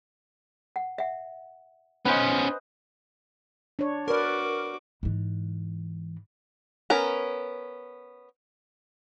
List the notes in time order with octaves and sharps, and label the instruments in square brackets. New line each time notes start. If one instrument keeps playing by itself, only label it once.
[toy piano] F#5
E5 F#5
[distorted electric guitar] B3 C#4 [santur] B4 C5 D#5 [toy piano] F#5 G#5
[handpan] D4 C#5
[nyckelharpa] F#4 D6 [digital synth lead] A#4 [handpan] B4 D5
[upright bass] G#2 E3
[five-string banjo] B3 C#4 A#4